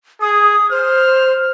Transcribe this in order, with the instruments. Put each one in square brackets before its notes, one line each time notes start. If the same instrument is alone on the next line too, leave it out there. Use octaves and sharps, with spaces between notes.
[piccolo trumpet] G#4 [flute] D#6
[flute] C5 [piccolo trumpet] F6